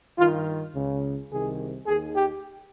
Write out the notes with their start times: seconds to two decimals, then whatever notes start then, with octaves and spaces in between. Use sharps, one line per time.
0.17 G2 D#3 F4
0.74 C#2 C#3
1.31 C2 C3 D#3 G#4
1.87 D#2 D#3 G#4
2.15 G4